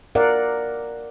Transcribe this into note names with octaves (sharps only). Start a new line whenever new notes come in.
A#4 D5 F5 F#5